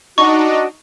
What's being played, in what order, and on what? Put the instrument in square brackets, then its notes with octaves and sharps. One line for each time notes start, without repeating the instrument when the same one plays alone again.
[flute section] D4 F#4 D#5 [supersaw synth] D#4 [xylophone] C#6